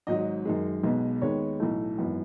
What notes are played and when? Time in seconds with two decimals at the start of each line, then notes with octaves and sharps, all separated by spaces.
0.07 G#1 G#2 F#3 D#5
0.45 F#2 D#3 G#3
0.83 B1 B2 G#3 B3
1.22 D#2 D#3 G#3 B3 C#5
1.60 B1 A2 E3 A3
1.98 G#1 F#2 E3 B3